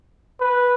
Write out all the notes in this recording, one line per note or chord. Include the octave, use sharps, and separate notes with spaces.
B4